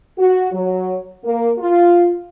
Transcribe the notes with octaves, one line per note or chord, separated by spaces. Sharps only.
F#4
F#3
A#3
F4